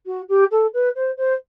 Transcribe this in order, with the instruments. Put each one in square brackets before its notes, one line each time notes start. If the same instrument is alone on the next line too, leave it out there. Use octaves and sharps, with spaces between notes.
[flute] F#4
G4
A4
B4
C5
C5